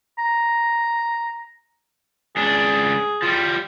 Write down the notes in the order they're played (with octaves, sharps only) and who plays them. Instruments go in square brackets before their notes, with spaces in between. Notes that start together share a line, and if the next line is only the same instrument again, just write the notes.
[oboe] A#5
[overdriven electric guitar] C#2 D4 [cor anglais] G#4
[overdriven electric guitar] F3 G3